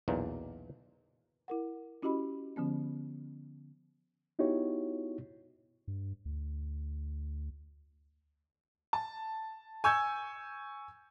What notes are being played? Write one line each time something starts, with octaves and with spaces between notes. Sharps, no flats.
B1 E2 A#2
E4 A#4 F#5
C#4 E4 F#4 G4 D#5 B5
D3 F3 B3 C#4
B3 D#4 E4 F#4 G4 C#5
G2
D2
A5
G#5 C#6 E6 G6 G#6